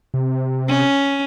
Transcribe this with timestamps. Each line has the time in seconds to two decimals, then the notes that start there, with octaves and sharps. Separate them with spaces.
0.14 C3
0.68 C#4